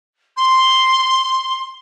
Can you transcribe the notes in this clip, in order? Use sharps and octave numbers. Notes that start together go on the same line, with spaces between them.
C6